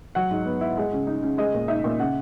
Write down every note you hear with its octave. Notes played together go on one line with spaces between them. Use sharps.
F#3 F#5
G#2
B3
E4
G#3
C#3
D#4
C#3
G#3 D#5
A#2
D#4 E5
A#2
C#3 F#5